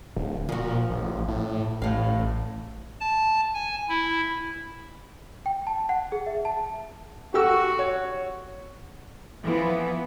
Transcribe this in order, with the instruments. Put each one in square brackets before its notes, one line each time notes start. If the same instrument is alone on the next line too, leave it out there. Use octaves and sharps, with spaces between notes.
[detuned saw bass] D1
[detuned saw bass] A#2 [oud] F3 F#4
[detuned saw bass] A1
A2
[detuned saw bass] A1 [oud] A2 F5
[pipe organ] A5
G#5
E4
[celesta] G5
A5
F#5
G#4
E5
A5
[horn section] F#4 [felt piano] G4 A4 E6
[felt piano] C#5
[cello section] E3 F3 B3